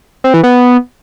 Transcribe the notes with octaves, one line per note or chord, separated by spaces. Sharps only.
C4
E3
B3